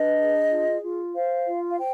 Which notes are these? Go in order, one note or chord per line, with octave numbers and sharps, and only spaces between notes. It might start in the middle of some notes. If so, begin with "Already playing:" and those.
Already playing: D4 B4 D#5
G#4
F4
F4
C5 F5
F4
F5
C5 G5